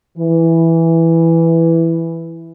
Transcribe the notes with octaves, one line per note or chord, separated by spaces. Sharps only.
E3